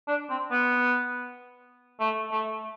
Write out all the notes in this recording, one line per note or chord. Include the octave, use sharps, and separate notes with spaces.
D4
C4
B3
A3
A3